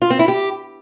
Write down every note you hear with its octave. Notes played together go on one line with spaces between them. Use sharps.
F4
C4
E4
G4